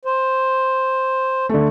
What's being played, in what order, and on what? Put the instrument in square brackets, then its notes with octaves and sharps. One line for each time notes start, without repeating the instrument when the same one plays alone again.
[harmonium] C5
[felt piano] D3 A3